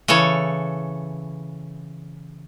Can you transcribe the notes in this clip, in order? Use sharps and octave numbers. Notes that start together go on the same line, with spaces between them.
C#3 E3 A4 C#5